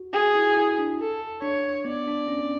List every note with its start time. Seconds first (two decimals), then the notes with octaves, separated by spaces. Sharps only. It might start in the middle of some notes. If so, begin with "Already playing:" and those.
Already playing: F#4
0.14 F#4 G#4
0.35 E4
0.57 E4
0.79 D4
1.00 A4
1.42 D4 C#5
1.85 B3 D5
2.07 D4
2.28 C#4